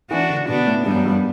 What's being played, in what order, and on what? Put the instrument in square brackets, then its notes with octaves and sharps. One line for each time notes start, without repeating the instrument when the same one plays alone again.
[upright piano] E3 [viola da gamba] D4 F#4
[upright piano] D3
[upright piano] B2 [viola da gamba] B3 D4
[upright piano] A2
[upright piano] G2 [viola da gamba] G3 B3
[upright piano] F#2
G2